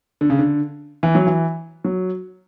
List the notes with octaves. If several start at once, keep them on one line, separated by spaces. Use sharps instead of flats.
D3
C#3
D3
E3
F#3
E3
F#3